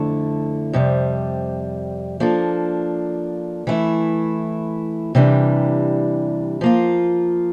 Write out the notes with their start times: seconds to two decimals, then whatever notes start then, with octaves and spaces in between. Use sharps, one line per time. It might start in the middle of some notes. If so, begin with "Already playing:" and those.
Already playing: F2 D3 A3 E4 A4
0.73 F2 C3 G3
2.20 F3 A#3 D4 A4
3.67 E3 A3 E4
5.15 C3 E3 G3 D4
6.61 F3 A#3 F4